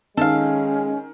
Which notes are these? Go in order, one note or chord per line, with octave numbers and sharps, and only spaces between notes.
D#3 G#3 C#4 A4 F5